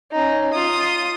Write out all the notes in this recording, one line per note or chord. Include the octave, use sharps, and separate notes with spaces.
C#4 D#4
F4 D#6